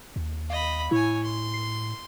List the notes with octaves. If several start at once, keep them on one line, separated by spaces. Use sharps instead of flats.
D#2
D#5 F5 B5
A2 E4 C#5 G#5
C6
C7